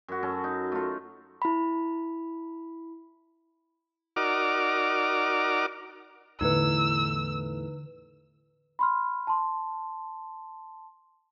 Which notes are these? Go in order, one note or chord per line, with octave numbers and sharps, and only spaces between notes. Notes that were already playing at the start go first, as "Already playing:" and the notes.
F#2 F#4
F#2 C#4 A4
D#4
A3 F4
E4 B5
D#4 F#4 A#4 D5 D6 F6
E2 A2 D3 E3 D#4 B4 E6
B5 C6 F6
A5 C6